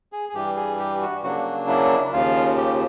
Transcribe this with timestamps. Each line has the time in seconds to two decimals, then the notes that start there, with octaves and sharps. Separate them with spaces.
0.12 G#4
0.29 G#4
0.34 G2 E3 G3 G4
0.57 G#4
0.79 G4
1.02 F#4
1.23 C#3 F#3 A#3 D4 F#4
1.68 E4
2.13 D#2 C#3 F3 F4
2.57 G4